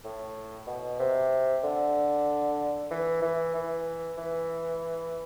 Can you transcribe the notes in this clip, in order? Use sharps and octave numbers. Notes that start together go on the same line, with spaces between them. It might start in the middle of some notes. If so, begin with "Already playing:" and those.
A2
B2
C3
D3
E3
E3
E3
E3